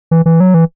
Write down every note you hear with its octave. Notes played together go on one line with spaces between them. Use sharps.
E3
E3
F#3
E3